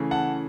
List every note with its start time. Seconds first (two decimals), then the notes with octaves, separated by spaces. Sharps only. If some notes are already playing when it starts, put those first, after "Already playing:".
Already playing: C#3 E3 A3 C#4
0.11 F#5 A5